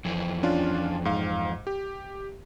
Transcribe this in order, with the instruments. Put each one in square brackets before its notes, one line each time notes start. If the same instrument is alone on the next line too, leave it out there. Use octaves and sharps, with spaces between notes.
[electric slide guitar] F2 E3 F3
[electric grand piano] C#4 D4 F4
G#2 F5
G4